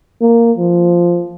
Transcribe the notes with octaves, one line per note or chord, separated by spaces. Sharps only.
A#3
F3